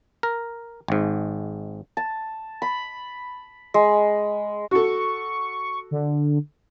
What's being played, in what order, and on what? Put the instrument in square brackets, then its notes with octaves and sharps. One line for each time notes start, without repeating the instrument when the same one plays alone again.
[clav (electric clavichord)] A#4
G#1 G#2
[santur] A5
B5
G#3
[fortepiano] F#4 A4 [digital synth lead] C#6
[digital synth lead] D3